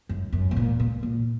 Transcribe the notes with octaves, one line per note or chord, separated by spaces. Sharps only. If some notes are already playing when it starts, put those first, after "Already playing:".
F#2
F#2
A2
A#2
A#2
A#2